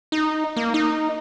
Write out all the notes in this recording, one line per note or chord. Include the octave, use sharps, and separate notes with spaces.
D#4
A#3
D#4